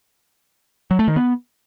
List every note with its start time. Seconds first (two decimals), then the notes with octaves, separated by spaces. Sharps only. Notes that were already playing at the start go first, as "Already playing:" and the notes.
0.91 F#3
0.99 A3
1.08 D#3
1.16 B3